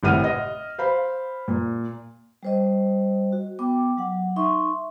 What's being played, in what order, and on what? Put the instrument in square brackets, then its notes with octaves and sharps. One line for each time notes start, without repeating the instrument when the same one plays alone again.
[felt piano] G#1 A2 C3 F#5 F6 D#7
D#5
C5 F5 B5
A#2
[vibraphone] G3 C5 D#5
F#4
B3 G5 D6
F#3 F#5
D#4 E5 C6 C#6